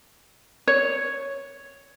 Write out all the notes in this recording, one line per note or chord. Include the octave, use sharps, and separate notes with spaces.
C#5